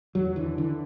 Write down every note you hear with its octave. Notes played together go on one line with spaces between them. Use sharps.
E2 F#3
D3 E3
D3 E3